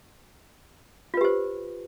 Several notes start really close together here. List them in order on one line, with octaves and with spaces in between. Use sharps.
F4 B4 G4 C5